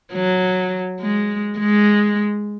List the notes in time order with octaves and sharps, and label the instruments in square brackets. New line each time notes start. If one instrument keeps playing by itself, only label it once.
[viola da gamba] F#3
G#3
G#3